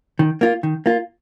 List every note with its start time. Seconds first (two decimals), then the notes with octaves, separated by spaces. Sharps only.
0.19 D#3
0.41 A#3 F4
0.63 D#3
0.86 A#3 F4